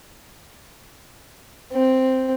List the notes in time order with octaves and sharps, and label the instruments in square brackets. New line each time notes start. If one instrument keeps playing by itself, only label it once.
[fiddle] C4